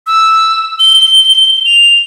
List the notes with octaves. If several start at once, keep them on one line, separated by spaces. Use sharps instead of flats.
E6
G7
F7